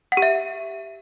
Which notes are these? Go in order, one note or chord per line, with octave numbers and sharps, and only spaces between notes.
F#5
G4
E5